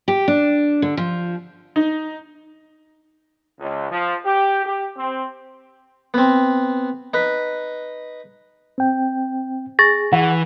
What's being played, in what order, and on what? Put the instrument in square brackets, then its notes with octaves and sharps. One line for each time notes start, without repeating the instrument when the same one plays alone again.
[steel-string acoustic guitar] G4
D4
D3
F3
[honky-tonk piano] D#4
[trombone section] C#2
F3
G4
G4
C4
[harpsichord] B3 C4
D#4 B4
[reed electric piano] C4 G5
[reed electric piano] G#4 [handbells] C#6 A6 A#6
[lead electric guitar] E3 [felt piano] F#5